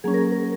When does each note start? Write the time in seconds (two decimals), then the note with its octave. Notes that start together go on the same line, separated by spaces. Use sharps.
0.04 F#3 A#3 C#4 G#4
0.14 A#4
0.18 G#4
0.32 A#4